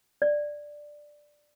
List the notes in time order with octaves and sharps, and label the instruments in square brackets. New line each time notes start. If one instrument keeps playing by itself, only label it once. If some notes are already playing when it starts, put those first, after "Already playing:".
[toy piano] D5